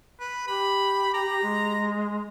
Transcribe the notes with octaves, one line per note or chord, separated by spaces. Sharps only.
B4
G4 B5
A#5
G#3